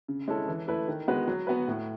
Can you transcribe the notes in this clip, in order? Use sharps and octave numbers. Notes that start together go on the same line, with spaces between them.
C#3
G#3 C#4 E4 A4
E3
A3 E4 B4
D#3
G#3 B3 F#4 B4
F#3
B3 F#4 B4
A2